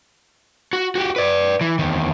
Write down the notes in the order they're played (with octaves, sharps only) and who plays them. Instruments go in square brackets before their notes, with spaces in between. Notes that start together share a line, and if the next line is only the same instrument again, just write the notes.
[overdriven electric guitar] F#4
F#4 G4
B4 D5
E3
E2 D#3